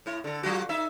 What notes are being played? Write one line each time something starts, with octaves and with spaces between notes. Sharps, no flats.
A2 E4
D3 A4
F#3 F4 F#4
D#4 E5